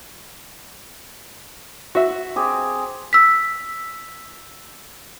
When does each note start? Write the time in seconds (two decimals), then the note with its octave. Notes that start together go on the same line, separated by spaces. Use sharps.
1.95 F#4 E5
2.36 C4 G4 G#4
3.13 E6 B6